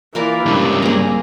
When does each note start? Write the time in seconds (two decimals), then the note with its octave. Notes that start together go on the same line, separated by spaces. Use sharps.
0.15 E3 A#3 F4 A#4 D5
0.46 C#2 G2 G4
0.82 A#3 C4 G#4 A#5